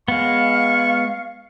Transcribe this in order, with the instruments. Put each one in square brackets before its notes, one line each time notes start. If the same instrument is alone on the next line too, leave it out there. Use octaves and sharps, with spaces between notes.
[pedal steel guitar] G#3 B3 [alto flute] F5 [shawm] C#6